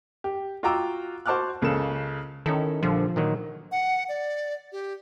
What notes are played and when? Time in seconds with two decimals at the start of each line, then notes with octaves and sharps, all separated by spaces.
0.24 G4
0.63 F4 F#4 G5 A#5 D6 E6
1.26 F#4 C5 A5 D6 F6 F#6
1.62 C#2 C#3 A#3 A4 E7
2.46 D#3 C#4 E4 A4
2.83 A#1 D3 F3 G3
3.16 A#2 D#3 F#3
3.72 F#5
4.09 D5
4.72 G4